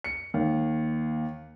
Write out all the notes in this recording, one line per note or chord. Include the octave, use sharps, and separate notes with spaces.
C#7
D#2